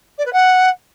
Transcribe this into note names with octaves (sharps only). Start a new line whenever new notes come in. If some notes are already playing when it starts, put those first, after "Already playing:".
D5
B4
F#5